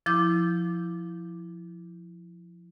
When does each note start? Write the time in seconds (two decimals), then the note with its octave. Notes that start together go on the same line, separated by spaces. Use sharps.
0.06 F3 E4 D6 G6